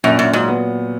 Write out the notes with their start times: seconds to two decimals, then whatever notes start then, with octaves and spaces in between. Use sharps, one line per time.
0.04 F#2 A#2
0.19 F#2 A#2
0.33 G#2 F#3
0.48 B3